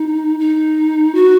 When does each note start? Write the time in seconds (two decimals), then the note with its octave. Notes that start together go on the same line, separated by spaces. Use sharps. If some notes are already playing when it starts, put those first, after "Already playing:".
Already playing: D#4
0.40 D#4
1.15 F#4